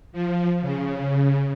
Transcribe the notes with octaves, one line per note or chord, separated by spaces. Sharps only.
F3
C#3